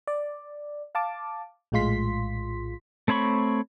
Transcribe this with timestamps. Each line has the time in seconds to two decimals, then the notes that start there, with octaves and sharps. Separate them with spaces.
0.07 D5
0.95 F5 A5 D6
1.72 A#1 A2 G#3 F4 C6 B6
3.08 A3 C4 C#5 B5 C#6